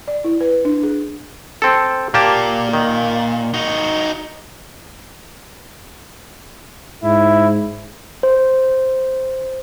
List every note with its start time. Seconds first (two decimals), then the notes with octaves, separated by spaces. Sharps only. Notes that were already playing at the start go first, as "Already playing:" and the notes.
0.08 D5
0.24 E4
0.41 B4
0.65 D4
0.83 G#4
1.62 C4 A4
2.14 A#2 A#3 G4 A5
2.73 D#3
3.54 D#4 F#4
7.04 G#2 E4
8.23 C5